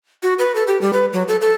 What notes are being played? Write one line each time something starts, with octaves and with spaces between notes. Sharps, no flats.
F#4
B4
A4
G4
G3
B4
F#3
A4
A4